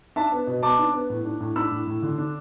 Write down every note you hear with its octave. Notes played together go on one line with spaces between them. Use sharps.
D4 E5 A5
B3
B2
B3 A5 D6
D4
B3
A2
D4
A2
D4 B5 E6
A2
A2
D3
D4